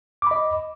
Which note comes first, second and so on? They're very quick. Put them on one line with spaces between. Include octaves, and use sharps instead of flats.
D6 B5 D#5